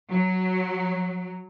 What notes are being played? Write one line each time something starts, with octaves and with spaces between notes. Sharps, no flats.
F#3